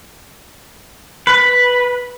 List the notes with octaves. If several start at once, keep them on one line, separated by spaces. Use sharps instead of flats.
B4